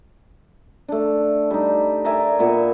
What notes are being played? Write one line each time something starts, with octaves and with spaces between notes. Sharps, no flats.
A3 D4
G3 D#4
A#4 D5 E5 G#5
A#2 B3 E5 C#6